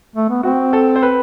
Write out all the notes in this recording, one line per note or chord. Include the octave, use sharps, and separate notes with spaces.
A3
B3
C4 F#4
A4
C5
B4